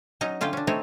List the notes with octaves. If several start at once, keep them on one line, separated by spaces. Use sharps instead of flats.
F#3 C#4 D#4 D#5
D3 C#4 F4 F5 G5
C#4 D4
A3 C4 D#4 E4 C#5